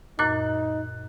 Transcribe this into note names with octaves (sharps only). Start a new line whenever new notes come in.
F#2 A#2 D#4 D6 F#6